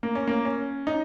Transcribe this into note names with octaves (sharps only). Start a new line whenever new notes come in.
A#3
C#4
A#3
C#4
D#4